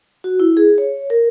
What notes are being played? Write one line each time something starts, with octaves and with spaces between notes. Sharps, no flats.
F#4
E4
G#4
C#5
A#4